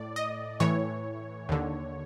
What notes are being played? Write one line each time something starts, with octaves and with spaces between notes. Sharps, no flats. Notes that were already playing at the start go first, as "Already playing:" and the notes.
Already playing: A2 D5
D#5
A2 E3 C#5
D#2 D3